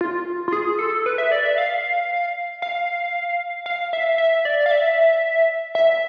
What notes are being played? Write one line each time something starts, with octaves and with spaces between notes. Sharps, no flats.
F4
F4
G#4
A4
B4
E5
D5
E5
F5
F5
F5
E5
E5
D5
F5
E5
E5